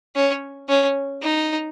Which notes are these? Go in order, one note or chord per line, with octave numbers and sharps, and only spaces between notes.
C#4
C#4
D#4